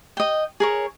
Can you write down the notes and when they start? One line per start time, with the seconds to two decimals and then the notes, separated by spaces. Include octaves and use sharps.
0.17 D#5 G5
0.60 G#4 A#4 C#5